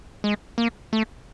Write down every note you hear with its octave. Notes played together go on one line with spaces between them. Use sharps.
G#3
A#3
A3